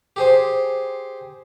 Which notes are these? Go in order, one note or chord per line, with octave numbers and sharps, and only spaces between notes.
G4 G#4 C5